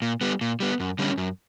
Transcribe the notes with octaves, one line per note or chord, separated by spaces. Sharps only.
A#2
G3 B3
A#2
G3 B3
F#2
D3 G3 C#4
F#2